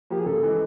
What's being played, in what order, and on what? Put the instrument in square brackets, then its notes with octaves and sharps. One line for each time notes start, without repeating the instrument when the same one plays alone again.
[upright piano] F3 A#3 [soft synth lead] G4
[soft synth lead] G#4
[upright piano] C#3 [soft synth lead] A4
[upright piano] E3 G#3